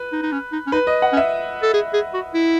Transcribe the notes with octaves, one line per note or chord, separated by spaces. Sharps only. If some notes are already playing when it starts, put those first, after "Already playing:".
Already playing: B4
D#4
D#4
C#4
D#4
C#4
D#4 B4
D#5
F#5
C#4
E5
A4
G#4
G#4
F#4
E4